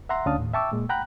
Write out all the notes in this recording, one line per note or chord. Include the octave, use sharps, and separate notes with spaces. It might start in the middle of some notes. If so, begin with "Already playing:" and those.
E5 F#5 A#5 C6
D2 C#4 D4 F5 A5 D#6
D#2 A2
E5 G5 A5 C#6 D6 E6
A#2 G#3 A#3
F#5 G5 A#5 B5 F#6